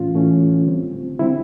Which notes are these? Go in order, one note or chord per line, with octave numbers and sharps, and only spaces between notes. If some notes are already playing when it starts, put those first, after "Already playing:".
Already playing: A2 E3 A3 C#4 F4
A2 E3 A3 C#4
D3 G3 C4
D3 G3 C4 E4